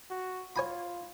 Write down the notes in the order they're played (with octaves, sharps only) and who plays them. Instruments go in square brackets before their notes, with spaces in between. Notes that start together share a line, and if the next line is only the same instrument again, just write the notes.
[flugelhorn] F#4
[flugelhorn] F4 [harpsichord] C#5 G#5 B5